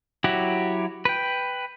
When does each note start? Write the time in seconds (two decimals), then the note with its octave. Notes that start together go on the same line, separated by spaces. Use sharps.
0.24 F#3 E4 F#4 G4
1.05 B4 G5